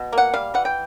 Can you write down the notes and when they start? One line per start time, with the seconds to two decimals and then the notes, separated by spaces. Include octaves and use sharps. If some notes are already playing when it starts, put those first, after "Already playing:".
Already playing: B2
0.12 A#3
0.18 F#5
0.34 G3 F5
0.54 E3 F#5
0.65 G5